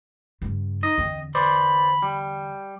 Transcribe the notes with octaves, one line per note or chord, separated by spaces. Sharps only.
G2 C#3
D#4 D#5
E2 D3 C4
B4 C5 D5 B5
G3